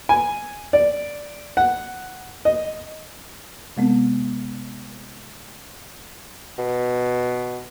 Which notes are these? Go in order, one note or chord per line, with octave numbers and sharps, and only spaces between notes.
G#5
D5
F#5
D#5
C3 G#3 B3 C4
B2